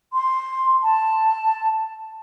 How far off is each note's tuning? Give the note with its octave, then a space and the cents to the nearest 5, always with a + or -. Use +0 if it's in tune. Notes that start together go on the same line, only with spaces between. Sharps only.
C6 +5
A5 +5